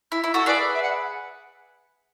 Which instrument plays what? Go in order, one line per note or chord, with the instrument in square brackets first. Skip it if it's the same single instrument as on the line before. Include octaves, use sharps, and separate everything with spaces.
[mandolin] E4
E4
F#4 A4
[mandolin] G#4 B4 [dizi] D5
[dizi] E5
F#5